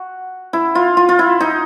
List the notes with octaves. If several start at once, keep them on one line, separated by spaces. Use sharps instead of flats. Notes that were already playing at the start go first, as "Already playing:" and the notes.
Already playing: F#4
E4
F4
F4
F4
E4
D#4